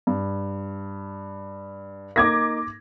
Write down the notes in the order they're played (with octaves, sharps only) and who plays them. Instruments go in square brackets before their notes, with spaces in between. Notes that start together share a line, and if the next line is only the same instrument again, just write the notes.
[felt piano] G2
[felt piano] A#3 D#4 [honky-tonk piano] D6 G#6 A#6